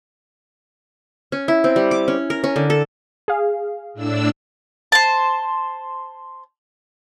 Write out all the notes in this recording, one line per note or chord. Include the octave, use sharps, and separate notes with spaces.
C#4
E4
C4
G3
D6
C#4
A#4
C#4
D3
A4
G#4 F5
A2 D4 E6
C5 A5